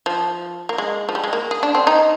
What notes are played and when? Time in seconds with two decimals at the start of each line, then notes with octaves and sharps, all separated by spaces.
0.06 F3
0.69 A#3
0.78 G#3
1.09 F3
1.15 G3
1.24 G#3
1.33 A#3
1.51 G#4
1.63 D4
1.75 C4
1.87 D#4